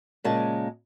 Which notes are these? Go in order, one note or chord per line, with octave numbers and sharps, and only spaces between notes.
A#2 C#3 G#3 A#3 A5